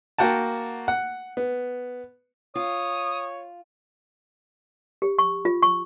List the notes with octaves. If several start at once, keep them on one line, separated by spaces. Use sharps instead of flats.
A#3 F#4 F#5 G5 A5
F#5
B3
F4 C#5 D#6
G4
C#6
F4
C#6